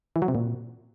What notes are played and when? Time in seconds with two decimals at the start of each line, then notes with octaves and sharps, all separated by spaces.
0.16 E3
0.22 F#3
0.28 C3
0.35 A#2